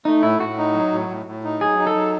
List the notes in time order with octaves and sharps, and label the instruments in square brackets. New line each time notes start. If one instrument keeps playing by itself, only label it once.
[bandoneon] A3 [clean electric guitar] D#4
[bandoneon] A2 [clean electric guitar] E4
[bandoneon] A2 [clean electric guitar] F#4
[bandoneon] D#4
F#3
A2
A2
A2
D#4
[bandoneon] F#3 [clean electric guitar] G#4
[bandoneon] D#4
[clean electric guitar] A4
[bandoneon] F#3